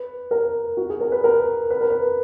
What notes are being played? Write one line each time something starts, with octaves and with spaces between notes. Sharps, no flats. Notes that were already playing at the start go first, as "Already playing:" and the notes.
Already playing: B4
A#4
F#4
G#4
A#4
B4
A#4
B4
A#4
B4